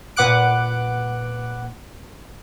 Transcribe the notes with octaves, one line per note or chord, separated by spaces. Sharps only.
A#2 B4 F#5 D6 F#6 D7